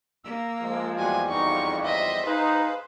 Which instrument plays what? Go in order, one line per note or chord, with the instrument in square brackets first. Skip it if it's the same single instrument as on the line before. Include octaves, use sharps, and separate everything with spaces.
[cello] A#3 [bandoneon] E6
[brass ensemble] F3 G#3
[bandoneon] E2 G3 [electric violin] F#4 G#5
[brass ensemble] B1 F2 [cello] D#4 [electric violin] C#6
[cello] C5 [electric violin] D#5 E5
[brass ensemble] D#4 [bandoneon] G#4 F5 [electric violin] B4